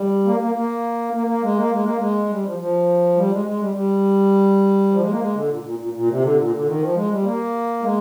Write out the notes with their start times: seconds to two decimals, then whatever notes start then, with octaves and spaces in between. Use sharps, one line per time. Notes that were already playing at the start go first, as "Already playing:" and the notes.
Already playing: G3
0.25 A#3
0.40 A#3
0.55 A#3
1.13 A#3
1.27 A#3
1.42 G#3
1.56 A#3
1.71 G#3
1.83 A#3
1.98 G#3
2.29 G3
2.44 F3
2.58 F3
3.16 G3
3.31 G#3
3.45 G#3
3.59 G3
3.74 G3
4.91 F3
5.01 G#3
5.10 A#3
5.20 G#3
5.34 D3
5.50 A#2
5.63 A#2
5.79 A#2
5.93 A#2
6.08 C3
6.22 D3
6.36 A#2
6.52 D3
6.66 D#3
6.80 F3
6.94 G#3
7.10 G3
7.23 A#3
7.82 G#3